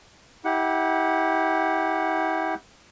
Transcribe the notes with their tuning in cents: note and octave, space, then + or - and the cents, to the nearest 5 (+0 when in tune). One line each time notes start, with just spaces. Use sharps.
E4 -35 G4 +0 F#5 +0